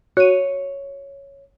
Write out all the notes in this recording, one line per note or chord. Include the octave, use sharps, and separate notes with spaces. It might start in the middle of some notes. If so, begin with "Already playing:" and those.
F#4 C#5 D#7